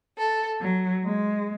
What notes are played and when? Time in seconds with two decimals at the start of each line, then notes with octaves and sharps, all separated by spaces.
0.17 A4
0.61 F#3
1.04 G#3